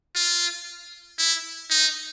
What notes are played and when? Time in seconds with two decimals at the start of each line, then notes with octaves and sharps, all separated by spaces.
0.15 F4
1.19 E4
1.70 D#4